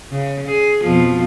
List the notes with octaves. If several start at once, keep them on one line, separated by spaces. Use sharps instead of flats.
C#3
G#4
F2 B2 F3